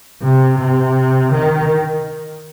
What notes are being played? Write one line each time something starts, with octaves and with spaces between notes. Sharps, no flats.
C3
C3
D#3